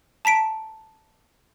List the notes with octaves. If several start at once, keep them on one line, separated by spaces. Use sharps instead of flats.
A5 A#5 B6 D7